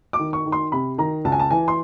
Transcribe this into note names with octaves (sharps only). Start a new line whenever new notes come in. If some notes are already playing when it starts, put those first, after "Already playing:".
D6
D#3
C#6
D#3
C6
C3 B5
D#3 A#5
C#2 A5
G#5
A5
E3 G#5
C6